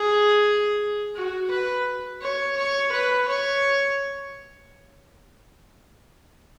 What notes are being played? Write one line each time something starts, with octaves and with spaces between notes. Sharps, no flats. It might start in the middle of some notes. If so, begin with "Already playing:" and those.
Already playing: G#4
F#4
B4
C#5
C#5
B4
C#5